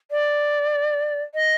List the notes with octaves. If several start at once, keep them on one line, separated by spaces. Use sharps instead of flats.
D5
D#5